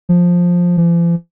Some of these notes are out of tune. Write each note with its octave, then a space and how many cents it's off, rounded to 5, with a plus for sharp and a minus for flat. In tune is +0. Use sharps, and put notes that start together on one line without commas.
F3 +10
F3 -45